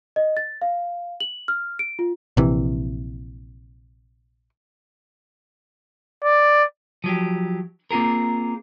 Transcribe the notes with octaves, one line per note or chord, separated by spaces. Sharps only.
D#5
A6
F5
F#7
F6
D7
F4
A#1 C3 E3
D5
F3 F#3 G4
A#3 C4 F4 G#4 A#4